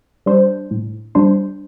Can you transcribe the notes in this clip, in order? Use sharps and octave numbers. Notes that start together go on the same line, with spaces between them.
G3 D4 C5
A2
G3 D4 C5